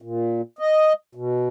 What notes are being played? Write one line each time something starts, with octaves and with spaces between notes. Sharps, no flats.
A#2
D#5
B2